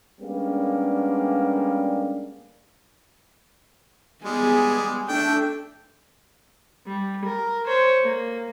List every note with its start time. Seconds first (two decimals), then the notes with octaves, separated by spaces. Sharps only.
0.21 G3 G#3 A#3 B3 C#4 D4
4.24 G3 G#3 B3 G#4
5.08 A3 D4 A4 G5
6.86 G3
7.25 A#4
7.67 C5 C#5
8.04 A#3